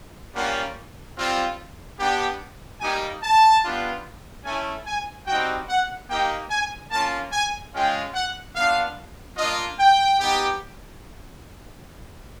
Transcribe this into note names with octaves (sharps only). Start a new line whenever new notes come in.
G3 A#3 C#4 F4 F#5
G3 C4 F4
B3 D4 G4
G3 A#3 D#4 G4 G#5
A5
G3 B3 D4 F4
A3 C#4 E4 G#5
G#5
G3 C4 D#4 F#4 G5
F#5
A#3 D#4 G4 G5
G#5
A#3 C#4 F4 A5
G#5
G#3 C#4 F4 G5
F#5
B3 D4 F4 F5
A#3 D4 F4 D#5
G5
B3 D#4 G4